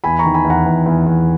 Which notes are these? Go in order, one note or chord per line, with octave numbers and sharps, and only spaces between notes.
E2 G#5 B5
A#5 C#6
D#3
G#5 B5
E2
F#5 A#5
E2
E2
E2